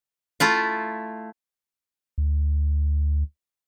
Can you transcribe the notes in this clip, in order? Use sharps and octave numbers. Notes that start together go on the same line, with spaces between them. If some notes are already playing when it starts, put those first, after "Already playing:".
A3 E4 F4
D2